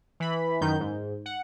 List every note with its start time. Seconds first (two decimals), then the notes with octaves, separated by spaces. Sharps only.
0.20 E3 B5
0.61 F#2 D#3 D#4 G6
0.80 G#2
1.26 F#5